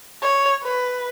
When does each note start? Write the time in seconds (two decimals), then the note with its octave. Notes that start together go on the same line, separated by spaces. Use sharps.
0.22 C#5
0.63 B4